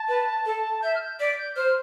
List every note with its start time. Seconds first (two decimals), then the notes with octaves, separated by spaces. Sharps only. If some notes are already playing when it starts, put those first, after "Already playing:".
Already playing: A5
0.09 B4
0.46 A4
0.82 E5 G6
0.95 F6
1.01 G6
1.20 D5 B6
1.38 G6
1.56 C5 F6